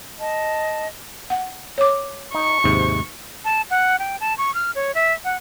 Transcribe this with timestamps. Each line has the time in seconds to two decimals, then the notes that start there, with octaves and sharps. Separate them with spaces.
0.20 D#5 A5
1.30 F#5
1.78 C#5 D6
2.34 D#4 C#6
2.64 D#2 G#2 C3
3.45 A5
3.70 F#5
3.99 G5
4.21 A5
4.38 C#6
4.55 F6
4.75 C#5
4.95 E5
5.25 F#5